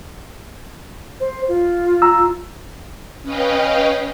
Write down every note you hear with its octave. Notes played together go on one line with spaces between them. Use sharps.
C5
F4
A#5 E6
C#4 B4 D#5 F5 G5